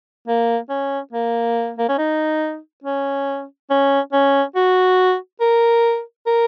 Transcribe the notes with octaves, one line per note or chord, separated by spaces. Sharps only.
A#3
C#4
A#3
A#3
C#4
D#4
C#4
C#4
C#4
F#4
A#4
A#4